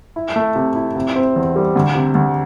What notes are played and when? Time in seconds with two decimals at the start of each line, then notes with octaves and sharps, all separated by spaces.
0.16 E4
0.36 A3
0.56 C3
0.75 E4
0.96 C3
1.16 C4
1.36 E2
1.56 G3
1.76 D2
1.95 C3
2.15 D2